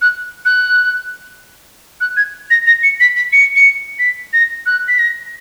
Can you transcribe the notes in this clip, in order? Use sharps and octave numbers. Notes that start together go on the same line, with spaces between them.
F#6
F#6
F#6
G#6
A#6
A#6
C#7
B6
B6
C#7
C#7
B6
A#6
F#6
B6
A#6